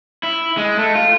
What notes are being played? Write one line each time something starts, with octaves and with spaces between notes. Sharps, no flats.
E4
G#3
A3
F4